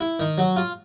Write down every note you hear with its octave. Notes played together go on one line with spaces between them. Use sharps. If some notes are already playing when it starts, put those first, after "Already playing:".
E4
D#3
F#3
F4